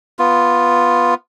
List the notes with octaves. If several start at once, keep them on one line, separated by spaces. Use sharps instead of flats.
B3 F4